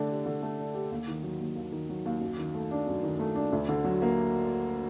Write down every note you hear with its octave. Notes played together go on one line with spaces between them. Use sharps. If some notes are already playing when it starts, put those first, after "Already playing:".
Already playing: D3 A3 D4
G4
D3
A3
D4
G4
D#2
D#3
F#3
D#2
D#2
D#3
F#3
D#2
F#2
D#3
A3
D4
F#2
D#3
A3
D4
D2
D3
F#3
A#3